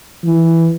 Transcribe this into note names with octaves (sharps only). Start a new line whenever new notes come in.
E3